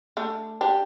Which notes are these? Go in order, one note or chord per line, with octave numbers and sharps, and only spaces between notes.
A3 D4
D4 G4